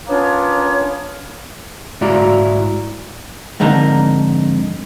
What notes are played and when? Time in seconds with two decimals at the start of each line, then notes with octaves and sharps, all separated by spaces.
0.07 A#3 B3 C#4 D4 F4 C#5
2.01 G#2 E4 F#4 D5 F5 A#5
3.60 F2 G#2 D3 D#4 A#4